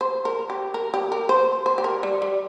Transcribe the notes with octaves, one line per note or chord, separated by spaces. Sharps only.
C5
A#4
G4
A#4
G4
A#4
C5
C5
G4
A#4
G3
G3